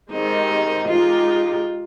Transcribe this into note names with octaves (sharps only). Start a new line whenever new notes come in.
D#3 G#3 C4 D#4 G4 C5
G#3 D#4 F4 G4